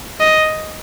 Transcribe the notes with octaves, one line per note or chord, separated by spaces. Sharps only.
D#5